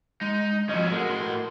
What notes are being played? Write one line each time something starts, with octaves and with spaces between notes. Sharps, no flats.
G#3 D#4
F3 F#3 C#4 E4 D#5
G#3 A3 F#4 A#4
A2 C6